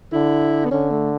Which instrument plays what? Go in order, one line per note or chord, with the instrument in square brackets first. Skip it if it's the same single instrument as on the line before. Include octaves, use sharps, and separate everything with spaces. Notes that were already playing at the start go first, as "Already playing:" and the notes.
[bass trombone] D3 [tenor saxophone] E4
[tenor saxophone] B3
[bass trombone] D3 [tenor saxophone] C#4
[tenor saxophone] A3